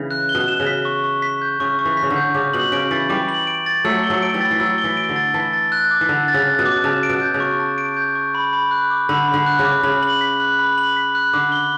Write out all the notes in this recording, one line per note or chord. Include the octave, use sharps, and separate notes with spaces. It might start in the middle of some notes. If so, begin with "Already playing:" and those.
Already playing: C#3 E3
F#6
G7
B2
E7
C#3
B6
C#6
C#6
B6
G6
C#3 C#6
C#6
E3
B6
C#3
D3
G6
C#3 D6
B2 F#7
C#3 D7
E3 A6
E3 G3 D6
F#7
D7
A6
F#3 A3 E6
G7
F#3 A3
D7
E3 G3
A6
E3
F#3 E6
G7
E3
D7
D3
A6
E3 A5
A6
F#6
D6
E3
D3 A5
A6
C#3
F#6
B2
D6
C#3 A5
D7
B2
G6
C#3
C#6
A5
D7
G6
C#6
B5
B5
F#6
D6
D3 B5
B5
D3
F#6
C#3
D6
C#3 B5
F#7
B6
F#6
B5
F#7
B6
F#6
D3 D6
G7